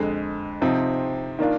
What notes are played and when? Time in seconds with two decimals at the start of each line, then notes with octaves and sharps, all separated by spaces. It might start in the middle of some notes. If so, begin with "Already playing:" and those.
Already playing: F2 D3 G#3
0.62 C3 F3 C4 D#4
1.39 D#3 A#3 D4 F4